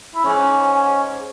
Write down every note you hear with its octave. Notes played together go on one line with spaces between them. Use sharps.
E4
G#2 C#4